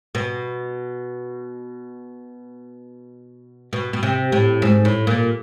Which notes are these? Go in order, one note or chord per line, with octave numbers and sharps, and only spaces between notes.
B2
B2
B2
C3
A2
G#2
A2
A#2